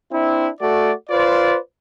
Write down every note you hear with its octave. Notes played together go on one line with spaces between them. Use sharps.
C4 D4 E4
A3 F#4 A4 D5
F4 B4 C5 D5